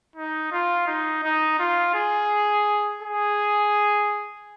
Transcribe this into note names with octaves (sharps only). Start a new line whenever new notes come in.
D#4
F4
D#4
D#4
F4
G#4
G#4